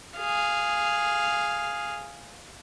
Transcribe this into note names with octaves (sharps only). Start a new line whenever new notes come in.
G#4 F5